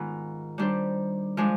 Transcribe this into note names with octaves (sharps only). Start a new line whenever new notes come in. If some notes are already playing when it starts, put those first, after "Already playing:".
Already playing: G#2 D#3 B3 F4
D#3 G3 D4 G4 C5
F3 G#3 D4